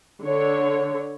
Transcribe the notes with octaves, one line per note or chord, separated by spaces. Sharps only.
D3 C#5